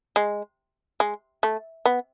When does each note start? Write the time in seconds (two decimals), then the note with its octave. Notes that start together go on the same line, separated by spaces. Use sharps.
0.16 G#3
1.00 G#3
1.43 A3
1.86 B3